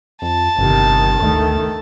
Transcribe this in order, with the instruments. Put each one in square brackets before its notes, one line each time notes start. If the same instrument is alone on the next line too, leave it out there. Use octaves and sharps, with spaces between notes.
[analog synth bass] F2 [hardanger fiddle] A5
[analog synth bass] G1 [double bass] C3 D#3
[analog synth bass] D2 [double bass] D#3 A3